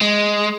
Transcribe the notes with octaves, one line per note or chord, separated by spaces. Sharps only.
G#3